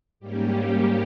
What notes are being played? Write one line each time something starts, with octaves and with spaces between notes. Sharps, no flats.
G#2 G3 A#3 C#4 G4